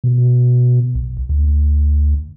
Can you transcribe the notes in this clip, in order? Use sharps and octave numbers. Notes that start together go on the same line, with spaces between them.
B2
B1
D2